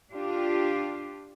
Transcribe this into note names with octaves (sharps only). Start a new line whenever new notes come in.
D4 F4 G4